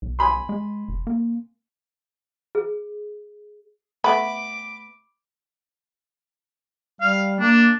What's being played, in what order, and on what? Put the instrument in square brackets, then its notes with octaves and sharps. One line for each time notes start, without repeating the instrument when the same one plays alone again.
[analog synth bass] B1
[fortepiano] G#5 B5 C6
[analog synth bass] G#3
F1
A#3
[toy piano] G#4
[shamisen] A3 B3 [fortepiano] B5 [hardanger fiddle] D6
[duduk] G3 [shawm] F5
[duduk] A#3 [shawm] D4